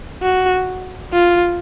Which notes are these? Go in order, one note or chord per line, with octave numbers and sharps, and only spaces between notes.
F#4
F4